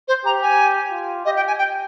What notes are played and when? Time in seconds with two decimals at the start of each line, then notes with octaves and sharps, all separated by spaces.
0.08 C5
0.25 G4 A#5
0.42 G#5
0.91 F4
1.25 G4 D#5
1.36 G5
1.47 G#5
1.58 G5